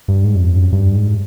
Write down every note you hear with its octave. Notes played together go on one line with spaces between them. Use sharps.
G2
G#2
F#2
F2
F#2
G2
G#2